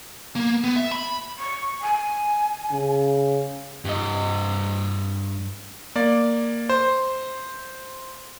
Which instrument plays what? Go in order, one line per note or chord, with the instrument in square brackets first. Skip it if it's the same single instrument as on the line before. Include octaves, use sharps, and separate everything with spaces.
[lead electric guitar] A#3
B3
E5
B5
[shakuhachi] C#6
G#5
[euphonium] C#3
[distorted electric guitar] G2 D#5
[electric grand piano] A#3 D5
C5